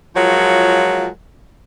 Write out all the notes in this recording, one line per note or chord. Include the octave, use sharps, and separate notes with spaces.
F3 F#3 G#3 F4 A#4 C#5